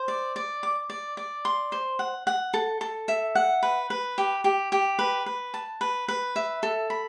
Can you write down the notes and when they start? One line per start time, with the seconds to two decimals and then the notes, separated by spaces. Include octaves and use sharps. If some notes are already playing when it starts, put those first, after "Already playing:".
Already playing: C5
0.08 D5
0.36 D5
0.63 D6
0.90 D5
1.17 D5
1.45 C6
1.72 C5
1.99 F#5
2.27 F#5
2.54 A4
2.81 A4
3.08 E5
3.35 F#5
3.63 B4
3.90 B4
4.18 G4
4.44 G4
4.72 G4
4.99 B4
5.26 B4
5.54 A5
5.81 B4
6.08 B4
6.36 E5
6.63 A4
6.90 B5